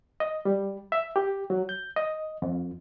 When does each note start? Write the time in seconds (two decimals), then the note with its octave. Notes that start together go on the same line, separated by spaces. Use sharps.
0.20 D#5
0.45 G3
0.92 E5
1.16 G4
1.50 F#3
1.69 G6
1.96 D#5
2.42 F2